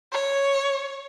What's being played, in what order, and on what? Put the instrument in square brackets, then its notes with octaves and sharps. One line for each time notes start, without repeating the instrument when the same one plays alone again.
[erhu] C#5